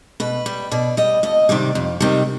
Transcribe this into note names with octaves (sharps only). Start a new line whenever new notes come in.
B2 B4
G3
B2 D5
G3 D#5
F2 D#5
C3 D#3 G3 D5
F2
C3 D#3 G3